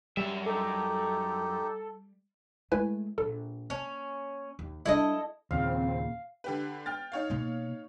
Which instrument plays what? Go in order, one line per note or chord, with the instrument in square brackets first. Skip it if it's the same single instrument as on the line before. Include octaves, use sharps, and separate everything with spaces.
[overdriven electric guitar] F#2 E5 [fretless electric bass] G3
[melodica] D#4 G4 [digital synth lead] A4
[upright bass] G#3 A3 [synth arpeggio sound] E4 B4 G#5
[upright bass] A#1 [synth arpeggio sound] A4
[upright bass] A#3 [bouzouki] C#4
[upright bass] D#2
[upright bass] G3 D4 [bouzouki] E4 A4 D#5
[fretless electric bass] D#2 A#2 C#3 [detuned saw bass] C4 [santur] F5
[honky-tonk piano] D3 G4 B4
G5 F6 A6
D#4 C#5 F5
[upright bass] B2 A#3